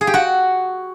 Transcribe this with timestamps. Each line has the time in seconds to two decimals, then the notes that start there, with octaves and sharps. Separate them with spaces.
0.01 G#4
0.07 G4
0.14 F#4